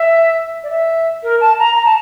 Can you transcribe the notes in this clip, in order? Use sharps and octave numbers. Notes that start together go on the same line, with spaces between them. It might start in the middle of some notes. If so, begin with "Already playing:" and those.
Already playing: E5
D5
E5
A#4
A5
A#5
A#5
A5